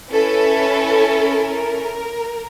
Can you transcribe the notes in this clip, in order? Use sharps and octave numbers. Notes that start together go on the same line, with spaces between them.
C#4 E4 A4 B4
A#4